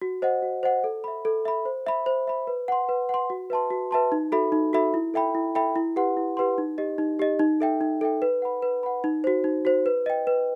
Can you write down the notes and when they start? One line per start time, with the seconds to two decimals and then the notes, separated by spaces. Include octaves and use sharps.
0.02 F#4
0.22 C5 D#5 F#5
0.42 F#4
0.63 C5 D#5 F#5
0.84 A4
1.04 E5 B5
1.25 A4
1.45 E5 B5
1.65 C5
1.87 E5 B5
2.06 C5
2.27 E5 B5
2.47 B4
2.68 F#5 C6
2.89 B4
3.09 F#5 C6
3.30 F#4
3.50 B4 E5 A5 C6
3.70 F#4
3.91 B4 E5 A5 C6
4.12 D#4
4.32 F#4 A4 E5 B5
4.52 D#4
4.73 F#4 A4 E5 B5
4.94 E4
5.14 A4 E5 G5 B5
5.35 E4
5.55 A4 E5 G5 B5
5.76 E4
5.96 G4 B4 F#5 C6
6.17 E4
6.37 G4 B4 F#5 C6
6.58 D#4
6.78 G4 D#5
6.98 D#4
7.19 G4 D#5
7.39 D#4
7.60 A4 E5 G5
7.81 D#4
8.01 A4 E5 G5
8.22 B4
8.42 F#5 B5
8.62 B4
8.83 F#5 B5
9.04 D#4
9.24 F#4 C5
9.44 D#4
9.65 F#4 C5
9.86 B4
10.06 D#5 G5
10.27 B4